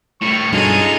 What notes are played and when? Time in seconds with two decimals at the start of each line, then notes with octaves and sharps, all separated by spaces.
0.21 A2 G3 C#6
0.52 B1 G2 F#3 G#3 D#4 F4 G#4 A4